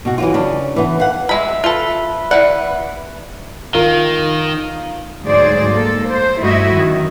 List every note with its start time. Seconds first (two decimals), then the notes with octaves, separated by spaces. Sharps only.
0.05 B2 F#4
0.18 E3 F#3 F4
0.34 C#3 D4
0.76 E3 B3
1.00 F5 F#5
1.29 G#3 E5 B5
1.64 F4 A4 B4 E5
2.31 E3 D5 F#5
3.74 D#3 F4 A#4 F5
5.24 D2 G#2 F#3 G#4 C5 D5
5.72 A#3 A4
6.09 C5
6.41 G2 A3 E4 F#4 D#5 E5
6.74 F#2 D#3